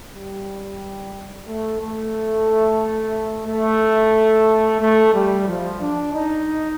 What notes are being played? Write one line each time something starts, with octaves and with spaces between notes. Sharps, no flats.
G3
A3
A3
A3
A3
G3
F3
D4
D#4